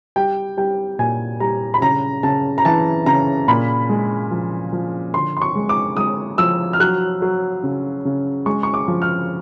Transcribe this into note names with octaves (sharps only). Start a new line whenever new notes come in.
G3 G5
G3 G5
A#2 G#5
G3 A#5
B5
C#3 A#5
C#3 A5
A#5
E3 A5
C#3 A#5
A#2 B5
G#3
F3
F3
D3 C6
C6
C#6
G#3
D6
G#3 D#6
F3 E6
F6
F#3 F#6
F#3
C#3
C#3
G#3 C#6
C#6
D6
F3
F6